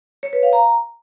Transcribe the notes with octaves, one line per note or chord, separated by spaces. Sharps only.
C#5
B4
F5
A#5